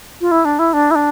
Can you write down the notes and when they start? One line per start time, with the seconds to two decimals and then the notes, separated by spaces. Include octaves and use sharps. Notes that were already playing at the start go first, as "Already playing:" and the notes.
0.21 F4
0.31 E4
0.45 D4
0.59 E4
0.73 D4
0.91 E4
0.95 D4